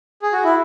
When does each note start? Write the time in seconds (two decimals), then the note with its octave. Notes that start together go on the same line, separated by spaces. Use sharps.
0.22 G#4
0.33 F#4
0.43 E4